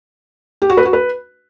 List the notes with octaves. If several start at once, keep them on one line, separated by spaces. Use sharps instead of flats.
G4
F#4
B4
F#4
B4